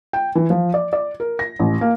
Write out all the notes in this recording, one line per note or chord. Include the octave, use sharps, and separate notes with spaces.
G5
E3
F3
D5
D5
A#4
A#6
A1
A#3